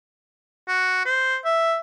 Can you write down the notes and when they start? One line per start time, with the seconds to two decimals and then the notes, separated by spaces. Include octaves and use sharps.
0.68 F#4
1.06 C5
1.45 E5